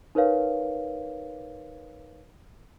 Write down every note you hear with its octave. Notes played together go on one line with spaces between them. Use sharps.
D#4 A#4 B4 C#5 F5